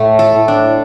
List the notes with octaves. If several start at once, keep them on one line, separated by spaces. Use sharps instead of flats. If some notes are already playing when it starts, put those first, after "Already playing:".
Already playing: A2 A3
A4
A2
D4